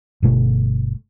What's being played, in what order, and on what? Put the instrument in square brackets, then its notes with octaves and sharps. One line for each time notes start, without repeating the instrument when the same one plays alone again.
[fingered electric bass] G1 B2 A3